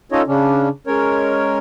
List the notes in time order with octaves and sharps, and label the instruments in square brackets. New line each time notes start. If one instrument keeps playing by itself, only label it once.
[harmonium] C#4 D#4 F4 A4 C#5 D#5
C#3 C#4 D4
G#3 C#4 A#4 C#5